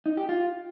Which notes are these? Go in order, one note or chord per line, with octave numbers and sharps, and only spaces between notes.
D#4
G4
F4